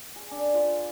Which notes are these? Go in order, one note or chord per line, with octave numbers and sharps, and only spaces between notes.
G#4
D4
F4